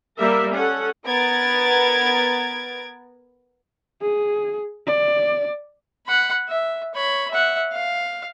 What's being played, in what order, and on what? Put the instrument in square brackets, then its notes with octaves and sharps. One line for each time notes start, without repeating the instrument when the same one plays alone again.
[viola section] G3 A#3 A#4 E5
C#4 A4 F#5
[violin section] B3 A#4 G#6 A6 D7
[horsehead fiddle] G#4
D5
[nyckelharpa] F#5 B5
E5
C#5 B5
E5 F#5
F5